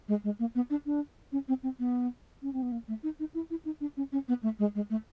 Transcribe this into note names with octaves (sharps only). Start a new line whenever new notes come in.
G#3
G#3
A#3
B3
D4
D4
C#4
C4
C4
B3
C#4
C4
B3
A#3
A3
D#4
D#4
E4
E4
D#4
D4
C#4
C#4
B3
A3
G#3
G#3
A3